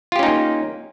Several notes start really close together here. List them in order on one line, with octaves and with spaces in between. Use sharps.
F4 G4 C#4 D#4 A#3